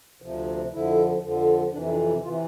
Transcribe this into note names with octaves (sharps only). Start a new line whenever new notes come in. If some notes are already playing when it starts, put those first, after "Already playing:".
D2 C3 F3
F2 D3 F3 E4
F2 D3 F3
F2 C3 E3 D4
E4
D4
E4
C3 E3 F4